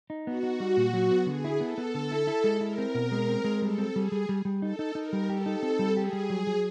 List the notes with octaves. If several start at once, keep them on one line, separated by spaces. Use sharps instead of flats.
D#4
B3 F#4
D#4
G3
A#2
F#3
B3
D3 G#4
E4
B3 A4
B3
D3
E4
E4
G#3
E4 A#4
C4
B2
G#3
C4
G#3
G3 A4
C4
G3 G#4
G3
G3
G3
D#4 A4
D#4
D#4 A#4
G3
G4 A4
D#4
C4
G3
G4 G#4
G3
F#3
F#3